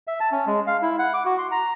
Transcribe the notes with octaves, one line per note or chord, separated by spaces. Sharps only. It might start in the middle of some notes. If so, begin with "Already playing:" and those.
E5
A5
C#4
G#3
F5
E4
F#5
D6
F#4
C6
A#5